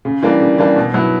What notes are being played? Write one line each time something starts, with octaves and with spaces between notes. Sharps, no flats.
C#3
E3 G3 A#3 D4
C#3
E3 G3 A#3 D4
B2
F#3 B3 E4